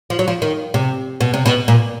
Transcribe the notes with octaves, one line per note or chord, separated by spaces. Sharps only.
F3
F#3
F3
D#3
C3
B2
C3
B2
A#2